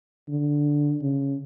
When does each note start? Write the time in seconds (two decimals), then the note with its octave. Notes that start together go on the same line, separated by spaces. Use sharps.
0.29 D3
1.02 C#3